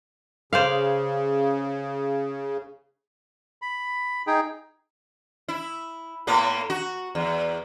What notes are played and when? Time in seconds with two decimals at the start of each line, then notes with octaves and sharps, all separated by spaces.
0.53 C#3 C5 D5 F5
3.62 B5
4.27 D#4 G#4 G5
5.48 E4
6.27 A2 A#3 B3
6.70 F#4
7.15 E2